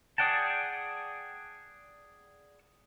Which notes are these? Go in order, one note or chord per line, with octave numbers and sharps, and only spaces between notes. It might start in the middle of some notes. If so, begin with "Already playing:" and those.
G#4 D5 F#5 G5 A5